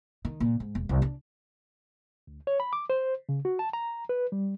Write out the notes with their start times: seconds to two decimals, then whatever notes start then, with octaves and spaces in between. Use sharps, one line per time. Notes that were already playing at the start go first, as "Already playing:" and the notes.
0.25 D#3
0.40 A#2
0.60 G#2
0.75 E1
0.89 C2
1.02 D4
2.27 D2
2.47 C#5
2.60 B5
2.73 D6
2.90 C5
3.29 C#3
3.45 F#4
3.59 A5
3.73 A#5
4.09 B4
4.32 G3